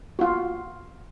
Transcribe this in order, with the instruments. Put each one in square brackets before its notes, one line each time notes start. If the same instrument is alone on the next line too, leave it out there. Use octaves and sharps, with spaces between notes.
[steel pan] F4 F#4